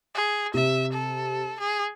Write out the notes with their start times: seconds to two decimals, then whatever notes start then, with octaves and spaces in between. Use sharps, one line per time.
0.15 G#4
0.54 C3 E5
0.93 A4
1.60 G#4